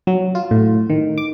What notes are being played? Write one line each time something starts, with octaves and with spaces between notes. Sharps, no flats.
F#3
F4
A2
D#3
D6